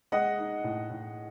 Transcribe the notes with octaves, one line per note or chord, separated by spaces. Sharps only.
G#3 D#5 F#5
D#4
A2
A2